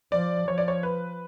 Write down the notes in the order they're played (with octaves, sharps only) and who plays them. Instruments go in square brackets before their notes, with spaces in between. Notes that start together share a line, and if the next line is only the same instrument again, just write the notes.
[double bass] F3 [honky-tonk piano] D5
[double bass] F3 [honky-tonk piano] C#5
[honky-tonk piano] D5
C#5
B4